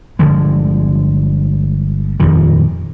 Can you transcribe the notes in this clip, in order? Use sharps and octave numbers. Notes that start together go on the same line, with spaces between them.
G1 D3 F3 G#3
D#1 F2 A#2 D#3